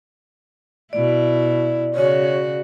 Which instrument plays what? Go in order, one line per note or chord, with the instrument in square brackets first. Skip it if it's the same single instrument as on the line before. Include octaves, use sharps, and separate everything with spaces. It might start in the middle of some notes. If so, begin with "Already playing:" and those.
[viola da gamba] B2 E4 [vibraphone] D5
[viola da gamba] C#3 F#4 [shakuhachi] C#5